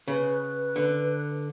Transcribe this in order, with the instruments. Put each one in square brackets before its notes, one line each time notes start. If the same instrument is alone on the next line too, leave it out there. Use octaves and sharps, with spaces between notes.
[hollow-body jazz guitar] C#3 [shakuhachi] B4
[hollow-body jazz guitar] D3